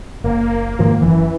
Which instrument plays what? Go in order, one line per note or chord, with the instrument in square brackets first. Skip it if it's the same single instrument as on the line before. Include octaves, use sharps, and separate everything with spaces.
[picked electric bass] F#1 [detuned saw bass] A#3
[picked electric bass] G#2 D#3 F3
[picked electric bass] F#1 F#2 [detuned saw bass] E3